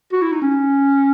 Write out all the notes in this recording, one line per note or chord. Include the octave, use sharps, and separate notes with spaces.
F#4
E4
D#4
C#4